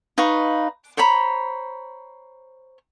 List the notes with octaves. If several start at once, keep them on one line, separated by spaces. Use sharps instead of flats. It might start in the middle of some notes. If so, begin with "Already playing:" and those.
D#4 B4 F5 C#6
C5 C#5 A#5 B5